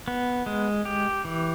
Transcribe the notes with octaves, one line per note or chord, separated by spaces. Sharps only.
B3
G#3
G4
E3